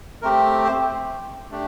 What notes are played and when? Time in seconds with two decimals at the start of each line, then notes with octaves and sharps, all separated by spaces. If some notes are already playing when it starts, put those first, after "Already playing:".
0.22 A3 C4 G4 A#4
0.65 C5
1.51 A3 D4 G4